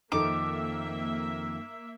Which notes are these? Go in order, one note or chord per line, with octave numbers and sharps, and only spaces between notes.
F2 D#3 F3 A#3 D#4 A4 E5 D6